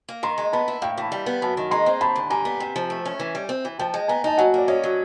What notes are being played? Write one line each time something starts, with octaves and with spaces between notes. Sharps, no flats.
A#3
D#3 A#5 C6
G#3
B3 A5 B5
E4
A2 F5 G5
E3 A5 B5
G3
B3
F#2 A5 B5
D#3
G#3 A#5 C6
C4
D#2 A5 B5
D3
G3 G#5 A#5
B3
C3
F3
A3
C#4
E3
G3
C4
E3
F3 G5 A5
G#3
B3 G#5 A#5
D#4 A5
F#3 F#5 G#5
A#3 D5
C#4 C#5 D#5
F#3